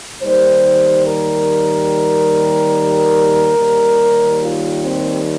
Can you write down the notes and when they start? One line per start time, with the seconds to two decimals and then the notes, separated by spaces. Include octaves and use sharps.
0.22 D#2 D#3 G3 C5
1.06 A#4
3.57 D#2 D#3 G3
4.41 F4
4.83 C4